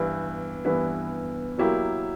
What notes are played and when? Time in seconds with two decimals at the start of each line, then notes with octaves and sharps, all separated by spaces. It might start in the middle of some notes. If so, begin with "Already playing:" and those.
Already playing: G2 E3 B3 E4
0.65 G2 E3 B3 E4
1.58 B2 F#3 A#3 E4 G4